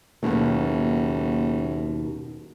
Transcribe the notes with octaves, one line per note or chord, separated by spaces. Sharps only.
F#1 D#2 B2